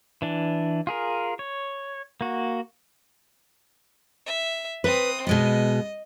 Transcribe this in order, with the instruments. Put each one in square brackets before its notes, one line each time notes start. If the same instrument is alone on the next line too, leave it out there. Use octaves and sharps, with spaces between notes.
[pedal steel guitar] E3 D4
F4 G#4 A#4
C#5
A#3 F#4
[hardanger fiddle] E5
[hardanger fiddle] C4 D#6 [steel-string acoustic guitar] B4
[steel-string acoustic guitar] B2 G#3 B3 [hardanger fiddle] D#5